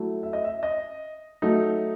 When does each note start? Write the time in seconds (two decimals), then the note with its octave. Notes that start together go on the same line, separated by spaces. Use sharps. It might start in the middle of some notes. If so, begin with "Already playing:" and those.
Already playing: F#3 A3 E4
0.23 E5
0.33 D#5
0.44 E5
0.63 D#5
1.42 F#3 A3 D#4